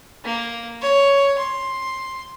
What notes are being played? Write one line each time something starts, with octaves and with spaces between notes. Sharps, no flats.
A#3
C#5
C6